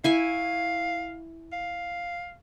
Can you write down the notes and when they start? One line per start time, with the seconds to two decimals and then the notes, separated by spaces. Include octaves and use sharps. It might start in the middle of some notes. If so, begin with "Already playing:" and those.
0.04 E4 F5 G#5 C#6
1.53 F5